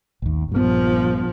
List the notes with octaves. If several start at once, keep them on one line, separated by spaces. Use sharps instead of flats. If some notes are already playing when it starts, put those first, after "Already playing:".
A1 D#2
A#1 G2 F3 B3